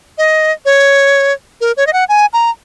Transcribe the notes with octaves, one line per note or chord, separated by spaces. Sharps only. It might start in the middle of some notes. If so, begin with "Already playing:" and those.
D#5
C#5
A#4
C#5
D#5
F#5
G#5
A#5